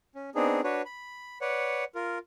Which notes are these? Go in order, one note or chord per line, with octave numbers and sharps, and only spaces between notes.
C#4
B3 C4 D4 D#4 G#4
D4 F#4 B4 C#5
B5
B4 C#5 D5 F#5
F4 A#4